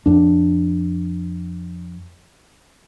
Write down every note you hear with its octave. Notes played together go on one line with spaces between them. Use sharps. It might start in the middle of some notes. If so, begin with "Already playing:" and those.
F2 D4